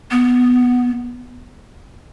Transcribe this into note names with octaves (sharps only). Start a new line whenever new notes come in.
B3